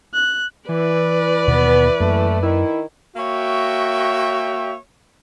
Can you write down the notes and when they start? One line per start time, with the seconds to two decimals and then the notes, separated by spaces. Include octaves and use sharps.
0.14 F#6
0.69 E3 B4 D5
1.47 D#2 B2 B3
2.00 F#2 A3 A#3
2.42 D#3 E4
3.16 A#3 F#4 C#5 E5 G5